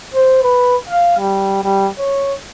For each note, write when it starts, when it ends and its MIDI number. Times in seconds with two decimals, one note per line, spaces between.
0.15 0.39 72
0.43 0.76 71
0.89 1.14 77
1.18 1.62 55
1.64 1.88 55
1.99 2.34 73